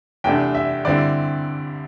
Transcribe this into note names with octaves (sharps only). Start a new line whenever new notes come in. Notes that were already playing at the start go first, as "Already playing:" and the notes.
E2 C3 A3 D4 G5
E5
G2 D3 C4 E4 D5